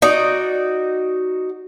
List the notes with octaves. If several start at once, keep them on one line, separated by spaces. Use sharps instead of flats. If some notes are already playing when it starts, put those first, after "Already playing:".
D#4 F#4 D5